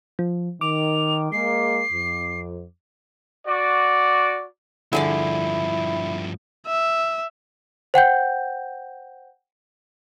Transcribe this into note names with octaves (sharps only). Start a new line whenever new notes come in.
F3
D#3 D6 F7
G#3 A#3 C7
F2
F#4 D5
G2 D3 F3 E4 G#4 D5
E5
C5 F#5 G5 G6